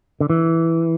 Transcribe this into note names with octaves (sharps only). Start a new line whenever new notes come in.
D3
E3